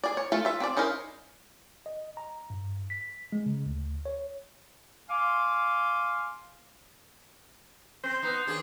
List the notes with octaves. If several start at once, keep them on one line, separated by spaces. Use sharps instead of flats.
G#4 D5
C#5
A3 F4 A4
F4 E5
C4 D4 D5
C#4 D#4 E4 A#4 C5
D#5
A#5
G2
B6
G#3
C#3
D2
C#5
F5 G#5 C6 D6
C4 C5
B3 D#4
D#2 D4 G#4